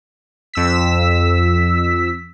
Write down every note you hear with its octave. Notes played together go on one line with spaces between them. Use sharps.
F2 E6 B6